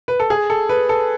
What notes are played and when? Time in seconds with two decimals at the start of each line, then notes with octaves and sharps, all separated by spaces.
0.08 B4
0.20 A4
0.30 G#4
0.50 A4
0.69 B4
0.89 A4